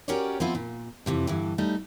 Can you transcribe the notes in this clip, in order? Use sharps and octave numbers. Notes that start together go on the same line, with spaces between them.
C#4 F#4 G4 A#4 C#5 D5
F3 B3 C4 E4 F4
A#2
F2 C3 E3
G2 D3 E3
G3 A3 D#4